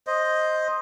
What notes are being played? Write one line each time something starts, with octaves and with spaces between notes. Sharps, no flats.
C5 D#5